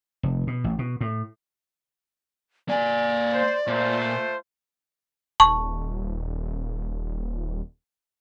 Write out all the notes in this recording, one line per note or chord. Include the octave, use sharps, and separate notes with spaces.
F1
B2
A1
B2
A2
A#3 D5 G#5
C5
A#2 A3 F4 C5
D#1 A5 C#6